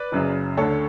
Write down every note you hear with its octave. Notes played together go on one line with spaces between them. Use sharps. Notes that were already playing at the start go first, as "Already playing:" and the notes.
Already playing: B4 D5
F#1 F#2 C#3
D2 D3 A4 C#5